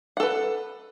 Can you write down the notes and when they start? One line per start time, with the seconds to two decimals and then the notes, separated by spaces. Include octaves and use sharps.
0.17 F#5
0.20 A4
0.23 B4